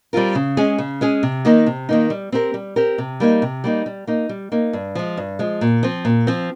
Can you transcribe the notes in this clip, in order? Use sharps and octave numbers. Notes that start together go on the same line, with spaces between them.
G3 C4 F4 A#4
C#3
G#3 C#4 G#4
C#3
G#3 C#4 G#4
C3
D#3 A#3 D#4
C3
D#3 A#3 D#4
G3
C4 G4 A#4
G3
C4 G4 A#4
C3
G3 A#3 D#4
C3
G3 A#3 D#4
G3
A#3 D#4
G3
A#3 D#4
G2
F3 G#3
G2
F3 G#3
A#2
F3 C4
A#2
F3 C4